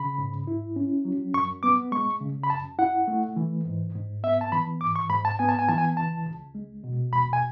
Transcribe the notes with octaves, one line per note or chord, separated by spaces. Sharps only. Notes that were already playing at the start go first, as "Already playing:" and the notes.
Already playing: C#3 B5
G#2
E4
C#4
F#3
F#2 C#6
B3 D6
G#3 C#6
C#3
B5
F#2 A5
E4 F#5
A3
E3
G#2
G#2
B3 E5
A5
E3 B5
G#2 D6
C#6
G#2 B5
A5
B3 G#5
A5
G#5
E3 A5
G#5
C#2 A5
C#2
G#3
B2
E2 B5
G#5